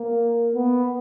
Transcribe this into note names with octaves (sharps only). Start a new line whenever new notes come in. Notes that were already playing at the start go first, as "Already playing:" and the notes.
Already playing: A#3
B3